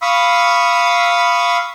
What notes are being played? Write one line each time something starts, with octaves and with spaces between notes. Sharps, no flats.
F5 B5 C#6 D#6 E6